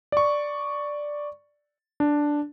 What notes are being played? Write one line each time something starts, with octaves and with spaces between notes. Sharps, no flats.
D5 C#6
D4